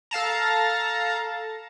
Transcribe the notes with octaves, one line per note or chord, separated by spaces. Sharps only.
A4 F5 A5 A#5